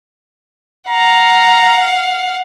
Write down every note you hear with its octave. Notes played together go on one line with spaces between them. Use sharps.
F5 F#5 A#5